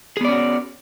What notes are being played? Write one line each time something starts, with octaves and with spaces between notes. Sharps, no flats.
B3 C#4 F#4 G#4 D5